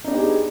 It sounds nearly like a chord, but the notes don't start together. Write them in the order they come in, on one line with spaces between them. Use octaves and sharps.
D#4 D4 B3 G4 G#4